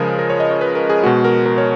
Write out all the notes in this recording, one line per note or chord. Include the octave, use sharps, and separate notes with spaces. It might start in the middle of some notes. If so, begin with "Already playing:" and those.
Already playing: C#3 F3 G#3 G#4 A#4
A#4
C#5
D#5
C#5
B4
A#4
G#4
B2 G#3 F#4
A#4
A#4
C#5